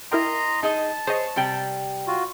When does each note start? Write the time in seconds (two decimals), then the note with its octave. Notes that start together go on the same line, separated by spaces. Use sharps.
0.12 E4 A#4 D#5 G5 A#5 C6
0.63 D#4 G#4 D#5 A5
1.07 G#4 C5 C#5 D#5
1.36 C3 G3 G5
2.07 F4 F#4